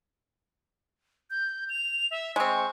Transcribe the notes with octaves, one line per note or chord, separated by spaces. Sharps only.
G6
F7
E5
G#3 C4 C#6